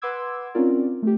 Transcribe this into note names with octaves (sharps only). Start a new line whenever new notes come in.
B4 F#5 C6 D6 E6 G#6
C4 C#4 D#4 F4 A#4 D5
A3 G4